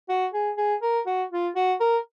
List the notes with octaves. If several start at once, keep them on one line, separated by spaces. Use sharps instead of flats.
F#4
G#4
G#4
A#4
F#4
F4
F#4
A#4